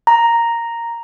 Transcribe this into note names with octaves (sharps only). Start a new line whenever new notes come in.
A#5